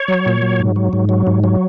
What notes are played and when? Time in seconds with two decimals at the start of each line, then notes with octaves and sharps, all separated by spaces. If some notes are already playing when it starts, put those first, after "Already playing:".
Already playing: C#5
0.08 F#3
0.26 A#2
0.42 F#3
0.59 G#2
0.76 F#3
0.93 G#2
1.09 F#3
1.27 G#2
1.44 F#3